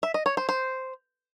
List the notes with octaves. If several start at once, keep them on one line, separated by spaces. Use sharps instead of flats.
E5
D#5
C#5
C5
C5